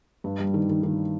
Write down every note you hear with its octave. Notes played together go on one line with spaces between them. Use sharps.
G2
G3
D#3
D#3
D#3